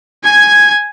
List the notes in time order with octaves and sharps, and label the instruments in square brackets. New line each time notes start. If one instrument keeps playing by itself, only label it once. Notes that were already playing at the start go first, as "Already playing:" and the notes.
[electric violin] G#5 G#6